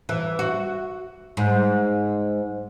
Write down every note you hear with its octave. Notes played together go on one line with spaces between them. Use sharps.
E3
F#4
G#2